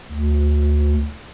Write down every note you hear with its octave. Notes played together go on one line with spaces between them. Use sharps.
D2